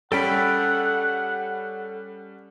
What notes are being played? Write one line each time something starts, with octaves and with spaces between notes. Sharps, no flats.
G3 C#4 A4 F#5 G5 B5